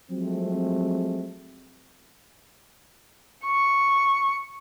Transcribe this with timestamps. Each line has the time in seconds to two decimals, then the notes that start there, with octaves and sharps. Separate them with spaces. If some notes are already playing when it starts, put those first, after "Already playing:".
0.11 F3 F#3 G#3 A3 C4
3.45 C#6